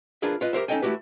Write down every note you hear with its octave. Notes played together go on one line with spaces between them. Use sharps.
D4 F4 G#4 A#4 B4 E5
F4 B4 D#5
G4 A#4 C5 E5
C#4 D#4 A4 D#5 G5 G#5
A3 E4 F#4 G4 B4